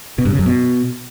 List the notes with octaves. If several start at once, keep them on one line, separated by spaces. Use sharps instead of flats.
B2
G2
C#3
F#2
B2